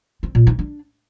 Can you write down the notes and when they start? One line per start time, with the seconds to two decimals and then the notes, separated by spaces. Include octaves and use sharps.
0.23 C4
0.35 A#2
0.47 D#4
0.59 D4